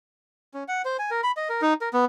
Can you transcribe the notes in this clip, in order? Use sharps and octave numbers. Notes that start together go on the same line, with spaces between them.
C#4
F#5
C5
G#5
A#4
B5
D#5
A#4
D#4
A#4
B3